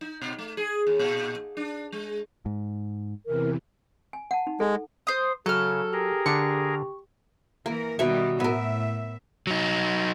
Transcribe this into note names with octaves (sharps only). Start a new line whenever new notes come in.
D#4
B2
A3
G#4
D#2
A#2
D4
G#3
G#2
E2 C3 E3 A#4
G#5
F#5 A5
D#4
G#3 A4
C5 D#6
C#3 F#3 A4 F6
G4 G#4 A#4 A#5
D3 D4 C#6
E3 A#3 A#4
B2 D#3 G3 C#5 E5
A2 B3 A#4 E5
F#3 D#4